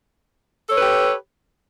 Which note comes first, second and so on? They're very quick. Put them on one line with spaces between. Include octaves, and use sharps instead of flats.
A4 C#5 B4 G4